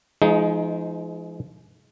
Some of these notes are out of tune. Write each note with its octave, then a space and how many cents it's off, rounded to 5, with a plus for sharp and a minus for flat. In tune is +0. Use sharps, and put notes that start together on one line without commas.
F3 -40 G#3 +20 D#4 +0